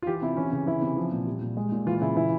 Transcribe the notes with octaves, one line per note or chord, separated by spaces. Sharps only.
F4
E3 G4
C3 E4
E3 C#4
C#3
E3 E4
C3
F3
A#2
G3
A#2
G#3
A#2
E3 F4
C#3 E4
E3 E4